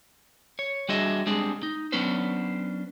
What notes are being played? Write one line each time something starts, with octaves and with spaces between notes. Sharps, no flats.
C#5
G3 D4 F#4 G#4 D#5 E5
G3 G#3 C4 D4 G#4
D#4
F#3 B3 C#4 D4 B4 C5